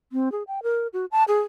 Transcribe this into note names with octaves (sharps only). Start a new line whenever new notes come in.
C4
G#4
G5
A#4
F#4
A5
G#4